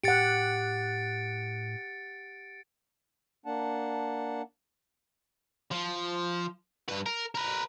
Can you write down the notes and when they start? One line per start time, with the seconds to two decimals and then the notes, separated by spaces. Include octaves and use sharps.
0.04 A2 G4 F#5 A6 C#7 D7
3.46 A#3 D4 F#5 A5
5.71 F3
6.89 G2 B4
7.06 A#4
7.35 A#4 B4